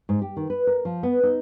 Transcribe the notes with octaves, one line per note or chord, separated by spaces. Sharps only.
G#2
G4
D#3
B4
A#4
F3
B3
D#4